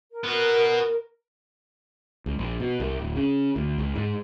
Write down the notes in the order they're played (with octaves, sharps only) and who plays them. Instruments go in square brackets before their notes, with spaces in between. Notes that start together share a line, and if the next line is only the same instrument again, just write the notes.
[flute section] A#4
[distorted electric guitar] B3 F#4
[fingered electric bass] C#2
A#1
B2
C2
D1
C#3
D2
C#2
G#2